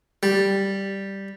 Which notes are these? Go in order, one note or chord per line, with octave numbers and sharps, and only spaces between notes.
G3